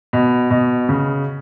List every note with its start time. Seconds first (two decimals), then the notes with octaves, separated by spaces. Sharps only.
0.13 B2
0.51 B2
0.89 C#3